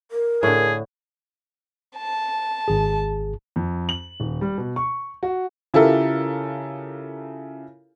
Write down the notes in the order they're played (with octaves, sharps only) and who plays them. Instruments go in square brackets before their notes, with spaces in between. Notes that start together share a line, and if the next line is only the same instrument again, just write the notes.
[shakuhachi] A#4
[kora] A2 D3 [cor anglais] G#4
[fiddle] A5
[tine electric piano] G#1 G#4
[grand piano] F2
F#7
D#1
G3
B2
C#6
F#4
[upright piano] C#3 E4 F4 G4 A4 A#4